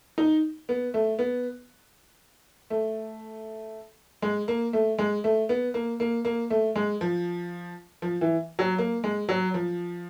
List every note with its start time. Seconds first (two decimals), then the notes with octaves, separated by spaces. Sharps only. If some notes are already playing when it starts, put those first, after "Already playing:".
0.18 D#4
0.69 B3
0.94 A3
1.19 B3
2.70 A3
4.22 G#3
4.48 A#3
4.73 A3
4.99 G#3
5.24 A3
5.49 B3
5.74 A#3
6.00 A#3
6.25 A#3
6.50 A3
6.76 G#3
7.01 F3
8.02 F3
8.21 E3
8.59 F#3
8.78 A#3
9.04 G#3
9.29 F#3
9.54 F3